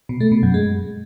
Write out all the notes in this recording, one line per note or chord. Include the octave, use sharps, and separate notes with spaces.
B2
A3
B2
F#2
G#3